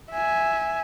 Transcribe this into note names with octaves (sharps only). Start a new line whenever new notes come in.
E5 G#5